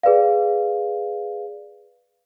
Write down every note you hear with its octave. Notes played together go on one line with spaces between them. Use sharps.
G#4 B4 D5 F5